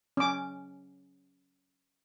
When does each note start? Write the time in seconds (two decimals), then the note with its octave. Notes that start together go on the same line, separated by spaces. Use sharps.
0.17 C#4 D6